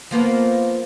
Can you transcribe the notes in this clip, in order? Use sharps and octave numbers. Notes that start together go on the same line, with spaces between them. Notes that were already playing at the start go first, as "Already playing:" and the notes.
F3 A#3 B3